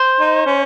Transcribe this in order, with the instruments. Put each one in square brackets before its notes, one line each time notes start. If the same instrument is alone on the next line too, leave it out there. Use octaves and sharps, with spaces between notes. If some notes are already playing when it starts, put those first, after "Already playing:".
Already playing: [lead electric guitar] C5
[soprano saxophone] D#4
C#4